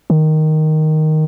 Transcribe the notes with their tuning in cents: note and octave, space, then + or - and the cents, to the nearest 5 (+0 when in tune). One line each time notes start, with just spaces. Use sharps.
D#3 +0